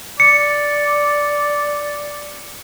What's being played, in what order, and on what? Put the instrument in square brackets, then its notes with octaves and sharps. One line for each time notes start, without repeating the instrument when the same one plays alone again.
[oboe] D5 [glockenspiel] C#7